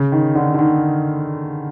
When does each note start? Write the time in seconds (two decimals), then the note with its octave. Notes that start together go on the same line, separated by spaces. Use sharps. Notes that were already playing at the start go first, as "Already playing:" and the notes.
Already playing: C#3
0.12 D#3
0.35 D3
0.54 D3
0.58 D#3